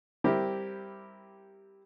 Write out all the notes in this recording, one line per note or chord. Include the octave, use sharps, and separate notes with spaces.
G3 C4 E4 G4 A#4